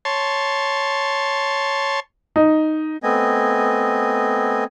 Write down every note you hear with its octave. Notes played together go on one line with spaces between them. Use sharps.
C#5 A5 C6
D#4
A3 B3 C4 D#5 G#5